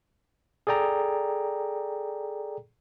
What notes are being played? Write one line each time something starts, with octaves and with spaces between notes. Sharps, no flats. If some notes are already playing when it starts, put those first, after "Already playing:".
G#4 A4 D5 G5 A#5